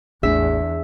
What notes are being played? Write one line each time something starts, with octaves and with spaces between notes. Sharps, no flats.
A1 E2 A3 D4 G#4 E5